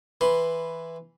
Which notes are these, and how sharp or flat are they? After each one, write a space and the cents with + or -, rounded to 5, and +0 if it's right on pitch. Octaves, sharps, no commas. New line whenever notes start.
E3 +0 B4 +0 C6 +0